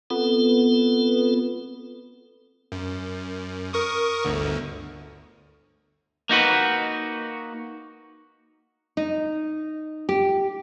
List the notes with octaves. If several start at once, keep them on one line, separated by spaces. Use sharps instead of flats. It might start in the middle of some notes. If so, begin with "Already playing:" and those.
B3 C4 F4 A4
F#2
A#4 C#6 D#6
G1 D2 D3
A#3 D#4 F#4 B4
D#4
G4